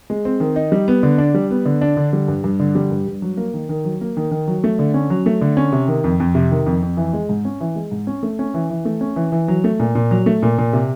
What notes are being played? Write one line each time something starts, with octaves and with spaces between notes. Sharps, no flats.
G#3
C4
D#3
D#4
G3
B3
D3
D4
G3
B3
D3
D4
D3
G3
G2
G2
D3
G3
G2
G2
F#3
A#3
D#3
D#3
F#3
A#3
D#3
D#3
F#3
A3
D3
C#4
F#3
A3
D3
C#4
C3
D#3
F2
F2
C3
D#3
F2
F2
E3
G#3
G#2
C#4
E3
G#3
G#2
C#4
A3
C#4
E3
E3
A3
C#4
E3
E3
F#3
A3
A#2
A#2
F#3
A3
A#2
A#2
C3